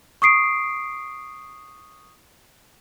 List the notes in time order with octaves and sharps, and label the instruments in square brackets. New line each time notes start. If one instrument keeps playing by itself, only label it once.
[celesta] C#6 D#6 C7 D7